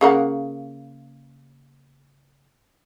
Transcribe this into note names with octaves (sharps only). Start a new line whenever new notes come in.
C#3 A#3 F#5